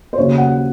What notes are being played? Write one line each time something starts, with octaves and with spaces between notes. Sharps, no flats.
C5
D#2 C#3 F#3 C#5
F#5